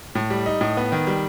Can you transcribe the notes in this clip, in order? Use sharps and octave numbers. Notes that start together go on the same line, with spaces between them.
A2
G3
D#4
A2
B3
D#3
G3